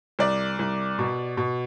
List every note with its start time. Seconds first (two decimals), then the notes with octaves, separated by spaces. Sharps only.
0.19 C2 D5
0.59 C2
0.99 B2
1.37 B2